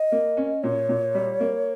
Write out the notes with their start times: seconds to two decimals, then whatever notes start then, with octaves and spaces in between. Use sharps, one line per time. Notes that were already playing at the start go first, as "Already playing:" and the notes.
Already playing: D#5
0.12 A#3
0.37 C#4
0.63 A#2 C#5
0.89 A#2
1.15 G3
1.40 A#3